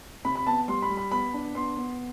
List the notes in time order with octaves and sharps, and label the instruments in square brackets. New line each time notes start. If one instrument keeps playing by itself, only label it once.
[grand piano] C3 B5
B5
B3 A5
G3 C6
B5
G3
B5
B3 B5
D4
B3 C6
B3